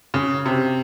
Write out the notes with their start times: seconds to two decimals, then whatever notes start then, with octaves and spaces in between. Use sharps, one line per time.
0.14 C#3
0.46 C3